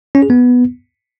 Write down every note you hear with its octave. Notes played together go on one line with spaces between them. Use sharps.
C#4
G#4
B3